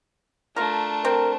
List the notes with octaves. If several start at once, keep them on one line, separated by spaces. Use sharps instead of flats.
A3 D4 F4 A#4
C4 A#4